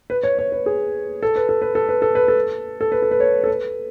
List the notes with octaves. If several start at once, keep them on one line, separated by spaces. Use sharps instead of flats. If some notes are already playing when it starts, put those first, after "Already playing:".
B4
C#5
C#5
B4
G#4
A4
B4
A4
B4
A4
B4
A4
B4
A4
A4
B4
A4
B4
C#5
A4
B4